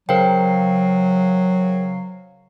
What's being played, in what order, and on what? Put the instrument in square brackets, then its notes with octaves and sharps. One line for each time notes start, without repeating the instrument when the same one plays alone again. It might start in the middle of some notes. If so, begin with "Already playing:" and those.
[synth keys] C#3 F5 C7 [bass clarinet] F#3 [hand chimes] A#4 C5 G5